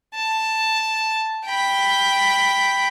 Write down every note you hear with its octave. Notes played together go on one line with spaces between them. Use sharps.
A5
G5 B5